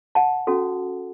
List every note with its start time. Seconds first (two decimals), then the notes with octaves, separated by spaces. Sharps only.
0.15 F#5 A5
0.47 C#4 F#4 A4